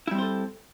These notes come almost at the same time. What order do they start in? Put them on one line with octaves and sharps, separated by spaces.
E4 G3 C4 C5 A4